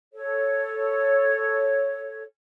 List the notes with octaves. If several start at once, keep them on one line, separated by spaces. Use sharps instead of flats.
A4 C#5